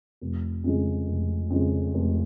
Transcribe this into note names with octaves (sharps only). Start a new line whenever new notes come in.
F1
F2 C#3 G#3
F1
F2 C#3 G#3
F1